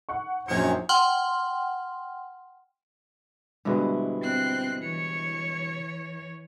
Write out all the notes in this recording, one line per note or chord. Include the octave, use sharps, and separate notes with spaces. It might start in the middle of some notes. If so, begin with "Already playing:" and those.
F#5 C#6
A#1 F#2 D#3 C5 C#5 C#7
F#5 G5 C6 F6
G2 B2 D3 G#3 E4 C5
C4 F#6 C7
E3 C#5 C#7